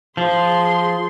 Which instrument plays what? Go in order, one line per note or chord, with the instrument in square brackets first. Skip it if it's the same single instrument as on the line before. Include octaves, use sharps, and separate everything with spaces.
[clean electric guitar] F3 [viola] G#4 C6